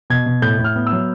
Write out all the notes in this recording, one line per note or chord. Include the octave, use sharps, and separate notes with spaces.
B2 G#6
B2
A2 G6
A2
F6
B3
E6
F#3